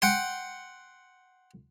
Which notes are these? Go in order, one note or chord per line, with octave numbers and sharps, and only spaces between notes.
F#5 G5 C6